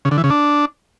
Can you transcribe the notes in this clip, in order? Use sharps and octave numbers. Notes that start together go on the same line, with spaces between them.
C#3
D3
E3
C#3
D4